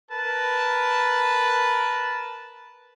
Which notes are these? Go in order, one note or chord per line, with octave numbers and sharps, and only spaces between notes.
A#4 B4 A5